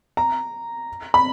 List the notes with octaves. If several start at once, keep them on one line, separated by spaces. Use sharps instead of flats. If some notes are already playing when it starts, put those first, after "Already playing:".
A#5
B5